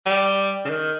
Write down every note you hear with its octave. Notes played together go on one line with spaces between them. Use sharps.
G3
C#3
D#3